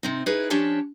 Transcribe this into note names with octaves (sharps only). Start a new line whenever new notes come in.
C3 C4 D#4
D#4 E4 G#4 B4 C#5
F3 C#4 D4 G4 C#5 A5